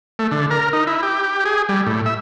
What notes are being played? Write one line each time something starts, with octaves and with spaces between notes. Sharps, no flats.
A3
D3
A#4
D#4
E4
G4
G#4
G3
A2
E5